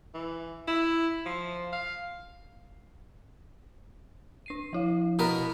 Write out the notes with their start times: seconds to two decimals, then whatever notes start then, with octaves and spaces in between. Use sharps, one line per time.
0.14 E3
0.68 E4
1.26 F3
1.73 F5
4.46 D4 C7 D#7
4.73 F3 E4 F5
5.19 B2 B3 E4 A#4 C#6 B6